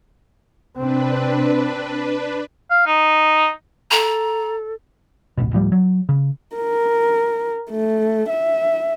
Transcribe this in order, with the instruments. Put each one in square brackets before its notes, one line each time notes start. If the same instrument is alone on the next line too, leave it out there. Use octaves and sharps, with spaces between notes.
[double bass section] C3 C4 [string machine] D4 B4
[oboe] F5
D#4
[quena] A4 [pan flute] A#5
[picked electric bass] D1 A1 B2
D1 A2 F3 G3
F#3
C#3
[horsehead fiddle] A#4
A3
E5